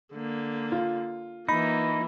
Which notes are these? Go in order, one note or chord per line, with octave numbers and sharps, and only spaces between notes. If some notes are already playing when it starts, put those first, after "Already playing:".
D3 A#3
F4
E3 A#3 D#4 B5